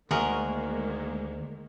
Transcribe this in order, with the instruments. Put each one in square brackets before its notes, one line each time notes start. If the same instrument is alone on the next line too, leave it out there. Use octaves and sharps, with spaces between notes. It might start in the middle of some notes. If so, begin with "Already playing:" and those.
[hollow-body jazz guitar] D2 [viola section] D#3 G#3 A#3 [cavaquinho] F#4 G#4 A#4